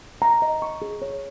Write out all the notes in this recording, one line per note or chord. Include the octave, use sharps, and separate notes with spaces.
A#5
D#5
C#6
G#4
C#5